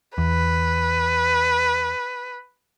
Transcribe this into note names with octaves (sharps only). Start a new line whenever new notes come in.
E2 B4